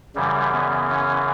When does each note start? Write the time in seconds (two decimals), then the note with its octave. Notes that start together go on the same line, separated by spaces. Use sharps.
0.15 F#2 C#3 E3 G3
0.52 B3
0.90 C#4